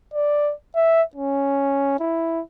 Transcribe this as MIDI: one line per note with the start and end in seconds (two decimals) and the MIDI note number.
0.14 0.53 74
0.76 1.02 76
1.16 1.98 61
2.00 2.41 64